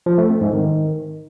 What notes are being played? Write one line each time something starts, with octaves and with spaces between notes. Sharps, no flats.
F3
A3
C4
G#2
D#3